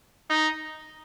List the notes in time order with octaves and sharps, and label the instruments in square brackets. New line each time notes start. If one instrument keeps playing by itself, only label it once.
[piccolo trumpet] D#4